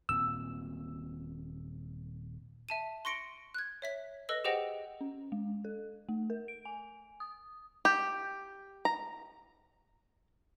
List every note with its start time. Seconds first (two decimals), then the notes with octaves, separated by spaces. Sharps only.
0.09 D#1 A#2 C4 E6
2.69 E5 A5 D#7
3.05 C6 C#6 A#6 C#7 D7 G7
3.54 F#6 G#6
3.82 C#5 E5 B6
4.29 A4 B4 D#5 E6 A#6
4.44 G4 G#4 C5 D#5 F#5 G5
5.01 C#4
5.32 G#3
5.65 A4
6.09 A3
6.30 A#4
6.48 D7
6.65 G#5
7.20 D#6
7.85 G4
8.85 A#5